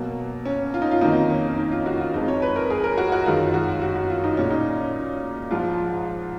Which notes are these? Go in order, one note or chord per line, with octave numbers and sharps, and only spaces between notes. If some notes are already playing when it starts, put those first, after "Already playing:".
Already playing: B2 F#3 A#3
C#4
F4
D#4
F4
F2 D#3 F#3 A#3 D#4
C#4
D#4
F4
F#4
F4
F2 F3 G#3 D#4
C#5
B4
A#4
G#4
A#4
F#4
F#4
F#2 D#3 G#3 F4
F#4
F#4
F#4
F4
D#4
A#2 G#3 C#4
D#4
G#2 F3 G#3 F4